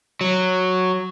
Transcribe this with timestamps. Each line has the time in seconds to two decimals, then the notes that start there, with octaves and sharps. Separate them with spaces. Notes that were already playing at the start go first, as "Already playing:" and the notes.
0.21 F#3